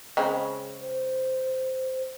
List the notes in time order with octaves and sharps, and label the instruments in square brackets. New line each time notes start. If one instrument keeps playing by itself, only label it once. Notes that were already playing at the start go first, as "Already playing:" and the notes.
[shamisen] C#3 G#3 C4
[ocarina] C5